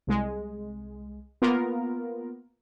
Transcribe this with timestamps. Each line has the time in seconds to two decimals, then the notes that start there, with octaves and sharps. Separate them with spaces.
0.07 C2 G#3
1.42 A#3 B3 F4 A#4